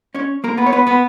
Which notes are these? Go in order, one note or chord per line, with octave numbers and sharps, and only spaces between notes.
C#4 C#5
A#3 A#4
B3 B4
C#5
B3 B4
B3 B4